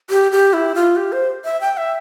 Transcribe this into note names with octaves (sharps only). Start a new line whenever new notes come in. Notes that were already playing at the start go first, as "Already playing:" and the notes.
G4
G4
E4
F4
G4
C5
E5
G5
E5